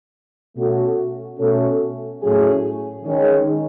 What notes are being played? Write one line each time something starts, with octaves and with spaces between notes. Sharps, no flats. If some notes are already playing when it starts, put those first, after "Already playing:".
B2 A3 C#4 F#4 A4
B2 A3 C#4 F#4 A4
A2 F#3 A3 C#4 G#4
D#3 G#3 C#4